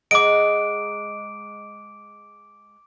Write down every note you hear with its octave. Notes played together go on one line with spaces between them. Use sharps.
G#3 F#5 A#5 D6 D7